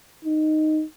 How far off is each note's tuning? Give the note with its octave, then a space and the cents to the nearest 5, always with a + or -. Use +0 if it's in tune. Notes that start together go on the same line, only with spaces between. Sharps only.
D#4 -5